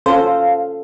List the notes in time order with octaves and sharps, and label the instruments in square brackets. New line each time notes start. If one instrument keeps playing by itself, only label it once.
[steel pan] C#4 F4 [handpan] A4 [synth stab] C5 [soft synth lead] F5